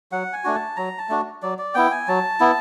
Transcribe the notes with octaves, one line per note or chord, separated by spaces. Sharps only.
F#3 F#5
G#5
A3 D4 F#4
A5
F#3 A#5
A5
A3 D4 F#4
F#3 D5
D5
B3 E4 G5
G#5
F#3 A5
B3 E4